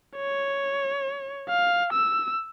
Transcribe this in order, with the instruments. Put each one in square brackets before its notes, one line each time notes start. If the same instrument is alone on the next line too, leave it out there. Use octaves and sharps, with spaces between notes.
[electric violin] C#5
F5
E6